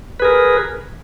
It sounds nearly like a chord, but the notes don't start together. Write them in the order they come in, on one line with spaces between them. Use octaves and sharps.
B4 G#4 A#4